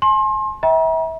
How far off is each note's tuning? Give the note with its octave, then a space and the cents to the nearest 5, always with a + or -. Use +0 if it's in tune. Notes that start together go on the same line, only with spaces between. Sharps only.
G#5 +45 C6 +30
E5 -30 G5 +0 A#5 +40